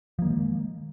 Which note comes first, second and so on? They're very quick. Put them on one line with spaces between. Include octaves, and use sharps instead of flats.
F3 A#3 D#3 G#3